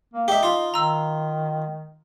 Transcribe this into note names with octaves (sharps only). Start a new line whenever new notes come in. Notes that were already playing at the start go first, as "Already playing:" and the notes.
A#3
D#4 G4 E5
F4
D#3 A#5 E6